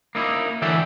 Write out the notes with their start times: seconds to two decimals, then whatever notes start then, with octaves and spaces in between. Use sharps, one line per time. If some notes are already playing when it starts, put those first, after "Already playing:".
0.15 A#3 D#4 E4
0.62 D3 E3 F#4 D5 E5 G5